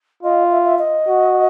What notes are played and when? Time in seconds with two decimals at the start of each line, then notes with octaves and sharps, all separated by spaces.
0.23 F4 D#5
0.51 E5
0.65 E5
0.79 D#5
1.08 F#4